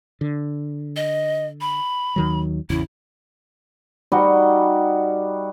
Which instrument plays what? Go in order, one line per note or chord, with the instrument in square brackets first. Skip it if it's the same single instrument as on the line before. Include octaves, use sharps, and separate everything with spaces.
[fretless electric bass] D3
[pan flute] D#5
B5
[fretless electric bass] D#2 D#3 F#3
[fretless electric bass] G#1 E2 C#3 [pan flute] E4
[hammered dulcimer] G3 D#4 F#4 D#5